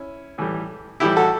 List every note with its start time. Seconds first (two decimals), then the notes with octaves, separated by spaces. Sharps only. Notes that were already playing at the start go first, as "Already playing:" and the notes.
Already playing: C#4 E4
0.38 A2 E3 G3
1.00 A2 E3 G3 E4 G4
1.16 F#4 A4